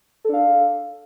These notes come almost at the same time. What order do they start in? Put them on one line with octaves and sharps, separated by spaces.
A4 D4 F5